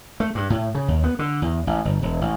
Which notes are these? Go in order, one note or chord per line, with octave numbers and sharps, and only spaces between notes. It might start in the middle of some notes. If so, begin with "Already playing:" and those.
A3
G2
A2
C#3
D#2
B3
D3
E2
A1
G1
E1
A1